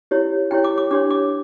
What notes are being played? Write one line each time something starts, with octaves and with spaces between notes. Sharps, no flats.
E4 G4 C#5
E4 G4 C#5 G5
D6
D6
D4 G4 C#5 D6
D6